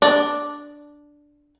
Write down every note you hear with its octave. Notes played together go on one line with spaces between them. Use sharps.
D4